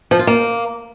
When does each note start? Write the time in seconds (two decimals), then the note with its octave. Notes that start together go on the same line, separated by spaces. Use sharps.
0.11 F3
0.19 F4
0.27 A#3